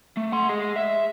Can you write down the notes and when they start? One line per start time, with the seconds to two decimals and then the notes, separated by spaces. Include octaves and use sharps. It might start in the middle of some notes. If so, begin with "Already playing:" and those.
0.17 A3
0.32 F#5 C6
0.49 G#4 D#5
0.76 E5